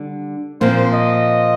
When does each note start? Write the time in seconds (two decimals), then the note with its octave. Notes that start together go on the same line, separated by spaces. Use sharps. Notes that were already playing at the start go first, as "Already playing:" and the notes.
Already playing: D3 G3
0.61 A#2 F3 C4 C5
0.94 D#5